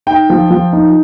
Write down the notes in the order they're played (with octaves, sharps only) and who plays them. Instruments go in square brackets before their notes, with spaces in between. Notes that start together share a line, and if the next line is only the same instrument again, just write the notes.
[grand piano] D#4 G5
F3
F3
D#4